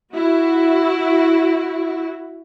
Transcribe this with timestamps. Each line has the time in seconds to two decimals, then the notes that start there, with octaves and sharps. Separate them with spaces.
0.12 E4 F#4